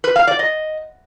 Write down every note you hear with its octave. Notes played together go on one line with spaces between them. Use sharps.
B4
F5
D5
D#5